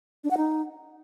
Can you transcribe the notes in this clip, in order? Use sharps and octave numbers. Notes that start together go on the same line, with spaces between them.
D4
F#5
D#4